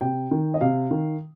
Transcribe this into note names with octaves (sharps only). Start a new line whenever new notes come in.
C3 G5
D#3
D#5
C3 F5
D#3